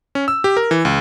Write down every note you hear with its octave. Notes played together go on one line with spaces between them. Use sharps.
C#4
E6
G4
A#4
E3
C#2